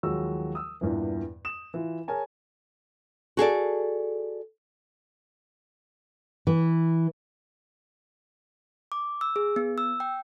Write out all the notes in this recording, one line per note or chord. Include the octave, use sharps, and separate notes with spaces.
D#2 F3 F#3 G#3 F#4 E6
D#6 E6
E2 G2 A#2 E3
D#6 E7
E3 F4
G#4 A#4 C#5 G#5 A5
F#4 G#4 A4 D5
E3
D6
E6
G#4
B3
E6
G5